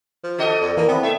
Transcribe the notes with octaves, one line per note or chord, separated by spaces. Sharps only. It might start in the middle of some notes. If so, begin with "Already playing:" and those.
F3
F#4 A4 D#5
F2 D5
E3 A#3
B3 C4 E4
A3 E5